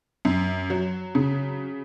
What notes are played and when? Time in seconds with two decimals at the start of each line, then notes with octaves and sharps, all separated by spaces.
0.25 F#2
0.70 F#3
1.15 C#3